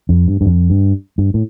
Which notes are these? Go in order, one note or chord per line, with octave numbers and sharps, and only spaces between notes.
F2
G2
G2
F2
G2
G2
A2